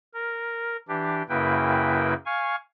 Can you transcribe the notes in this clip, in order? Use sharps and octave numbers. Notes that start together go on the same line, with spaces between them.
A#4
E3 D4 G4
F#2 C#3 A#3 E4 B4 G5
F5 G#5 C#6